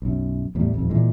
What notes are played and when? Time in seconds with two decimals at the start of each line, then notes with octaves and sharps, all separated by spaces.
0.02 B1 F#2
0.55 E2 A2 G3
0.74 D#1 F2
0.90 A#2 E3 G#3